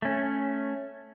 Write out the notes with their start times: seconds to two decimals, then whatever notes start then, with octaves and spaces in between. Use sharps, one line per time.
0.02 A3 C#4